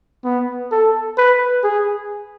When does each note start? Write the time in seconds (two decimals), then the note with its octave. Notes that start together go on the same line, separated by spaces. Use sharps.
0.24 B3
0.72 A4
1.17 B4
1.64 G#4